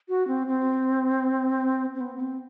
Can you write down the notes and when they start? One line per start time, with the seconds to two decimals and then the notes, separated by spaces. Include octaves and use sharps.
0.09 F#4
0.28 C4
0.47 C4
1.95 C4
2.01 B3
2.16 B3
2.20 C4